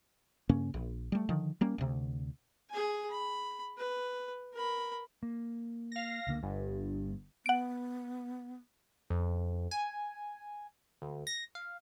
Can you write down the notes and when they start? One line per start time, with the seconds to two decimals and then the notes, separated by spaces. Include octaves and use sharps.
0.49 G2 C#3 A#3 C#4
0.74 A#1
1.12 G3 A3
1.29 D3 D#3 F3
1.61 G3 A#3 C#4
1.78 D2 C3
2.70 G#4 G#5
3.10 B5
3.78 B4
4.53 A#4 B5
5.23 A#3
5.92 F5 A#6
6.27 C#2 D3 A#3
6.43 G1 G2
7.46 B3 F#5 D7
9.10 F2
9.71 G#5
11.02 D2
11.27 A#6
11.55 F5